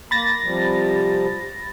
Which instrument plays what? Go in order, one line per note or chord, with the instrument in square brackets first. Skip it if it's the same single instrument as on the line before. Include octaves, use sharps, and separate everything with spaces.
[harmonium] A#3 [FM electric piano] B5 A6 A#6
[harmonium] C3 F3 G3